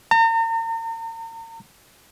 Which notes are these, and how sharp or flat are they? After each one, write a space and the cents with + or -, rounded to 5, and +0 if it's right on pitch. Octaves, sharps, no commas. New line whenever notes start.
A#5 -40